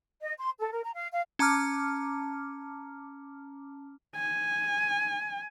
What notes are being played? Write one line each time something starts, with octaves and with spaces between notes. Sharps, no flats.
D#5
C6
A4
A#4
A#5
F5
F5
C#4 A5 A#5 D6 F6
G#5